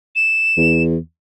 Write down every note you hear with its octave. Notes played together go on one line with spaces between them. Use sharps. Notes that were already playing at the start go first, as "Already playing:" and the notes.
E7
E2